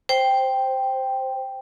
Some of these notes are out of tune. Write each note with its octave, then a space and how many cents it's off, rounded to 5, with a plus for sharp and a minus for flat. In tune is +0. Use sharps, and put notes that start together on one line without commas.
C5 +0 G5 +0